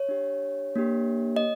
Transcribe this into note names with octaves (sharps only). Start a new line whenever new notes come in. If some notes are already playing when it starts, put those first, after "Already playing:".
Already playing: C#5
D4 G4
A#3 D4 G4
D#5